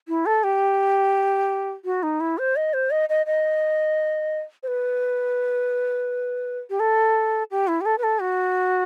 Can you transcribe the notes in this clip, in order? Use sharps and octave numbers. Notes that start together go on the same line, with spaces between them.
E4
A4
G4
F#4
D#4
E4
C5
D#5
C5
D#5
D#5
D#5
C5
B4
G4
A4
G4
E4
G4
A4
B4
A4
F#4